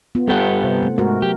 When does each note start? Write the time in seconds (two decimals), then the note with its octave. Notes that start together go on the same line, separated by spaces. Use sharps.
0.15 B3 F4
0.28 G2 B3 G4 A4 F#5
0.62 C3 C5
0.83 A3
0.98 G#2 A3 F#4 A#4
1.22 F#3 G4